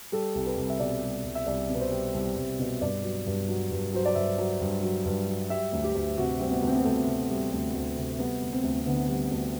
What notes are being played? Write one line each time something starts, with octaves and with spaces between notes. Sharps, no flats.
G3 A4
C2
B4
C2
E5
B2 D5
G3
C2
E5
C2 D5
B2
B4
C5
G3
C2
C2
B2
G2 D5
F#3
G2
F#3
G2
F#3 C5
D5
G2 E5
F#3
G2
F#3
G2
F#3
G3 E5
D2
G4
D2
C3 F#4
G3 C4
B3
D2
C4
B3
D2 A3
C3
G3
D2
D2
C3
G3 B3
D2
C4
D2
C4
D3 B3
G3
D2